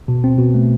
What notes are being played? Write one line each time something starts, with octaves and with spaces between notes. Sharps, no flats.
B2
C4
B2
A3